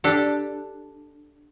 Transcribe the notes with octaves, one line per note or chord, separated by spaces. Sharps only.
D4 G4 A4